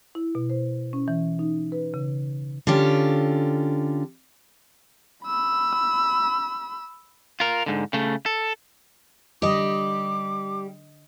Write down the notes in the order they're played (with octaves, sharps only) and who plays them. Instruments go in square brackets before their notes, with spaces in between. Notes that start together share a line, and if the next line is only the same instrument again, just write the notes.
[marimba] E4
B2
C5
C#4
E3
D#4
B4
C#3
[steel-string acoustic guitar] D3 C#4 F4 G4
[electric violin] B5 E6
[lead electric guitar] F4 A#4
G#2 D3
C#3 A3
A4
[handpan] D3 D#5 [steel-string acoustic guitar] G3 G4 [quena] D6